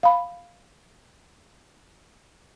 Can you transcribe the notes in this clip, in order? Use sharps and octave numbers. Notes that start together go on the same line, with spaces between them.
F5 B5